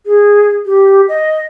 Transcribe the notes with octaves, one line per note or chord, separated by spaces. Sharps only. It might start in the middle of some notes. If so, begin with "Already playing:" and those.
G#4
G4
D#5